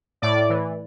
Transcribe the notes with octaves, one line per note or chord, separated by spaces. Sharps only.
A2 D5
E3